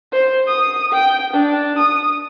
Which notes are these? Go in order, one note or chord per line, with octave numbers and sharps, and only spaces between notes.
C5
D#6
G5
D4
D#6